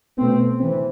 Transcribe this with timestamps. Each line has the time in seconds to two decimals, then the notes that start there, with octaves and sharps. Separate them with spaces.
0.17 B2 A3 B3 C4
0.60 E3 C4